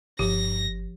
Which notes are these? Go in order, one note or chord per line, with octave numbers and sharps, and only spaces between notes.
G1 G2 F3 G4 A#6